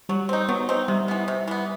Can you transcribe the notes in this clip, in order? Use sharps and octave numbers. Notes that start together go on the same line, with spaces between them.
F#3 G3
C4 D#4
F#3 B3
C4 D#4
C3 G3
E3 B3
C3
E3 B3